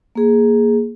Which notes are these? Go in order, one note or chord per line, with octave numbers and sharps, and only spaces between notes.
A#3 G#4